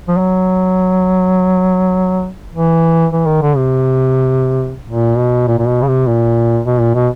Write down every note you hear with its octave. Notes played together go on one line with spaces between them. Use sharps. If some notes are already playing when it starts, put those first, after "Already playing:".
F3
F#3
E3
E3
D#3
D3
C3
A#2
B2
A#2
A#2
B2
C#3
C3
A#2
B2
A#2
B2